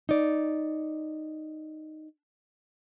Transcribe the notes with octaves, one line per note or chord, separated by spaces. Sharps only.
D#4 D5